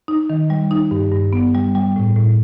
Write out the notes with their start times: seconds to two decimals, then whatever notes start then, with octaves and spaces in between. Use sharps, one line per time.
0.08 D#4
0.30 D#3
0.50 G3
0.71 D#4
0.91 G2
1.12 G2
1.33 B3
1.55 G3
1.75 G3
1.96 A2
2.16 A2